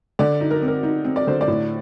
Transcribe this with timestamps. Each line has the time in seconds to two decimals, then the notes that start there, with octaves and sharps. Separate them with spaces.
0.19 D3 D5
0.40 D#4
0.51 A#4
0.62 C4
0.68 A#4
0.83 D#4
1.05 C4
1.16 D5
1.27 D3 C5
1.41 D5
1.48 A2